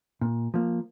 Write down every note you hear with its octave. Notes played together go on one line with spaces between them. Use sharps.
A#2
F3 A#3